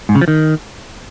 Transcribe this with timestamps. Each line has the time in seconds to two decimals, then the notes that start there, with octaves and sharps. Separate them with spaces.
0.09 G#2
0.15 C#3
0.21 F3
0.28 D#3